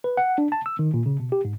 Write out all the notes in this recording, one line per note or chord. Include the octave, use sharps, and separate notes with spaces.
B4
F#5
D4
A5
E6
D#3
A#2
C#3
B2
G4
G#2